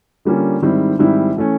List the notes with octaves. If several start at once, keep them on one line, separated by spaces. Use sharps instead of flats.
D3 G3 A#3 C#4 F4
G#2 D#3 G3 C4 E4
G#2 D#3 G3 C4 E4
E3 A3 C#4